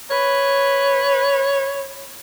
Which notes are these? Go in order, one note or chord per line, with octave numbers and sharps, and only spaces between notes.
B4 C#5